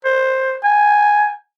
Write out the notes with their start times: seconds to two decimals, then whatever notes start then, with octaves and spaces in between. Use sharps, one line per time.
0.05 C5
0.63 G#5